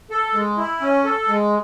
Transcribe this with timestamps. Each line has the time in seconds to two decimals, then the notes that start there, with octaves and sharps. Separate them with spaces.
0.11 A4
0.34 G#3
0.57 E4
0.81 C#4
1.05 A4
1.28 G#3